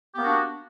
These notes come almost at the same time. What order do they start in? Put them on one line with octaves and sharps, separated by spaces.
G4 B3 A#3 F#4 D4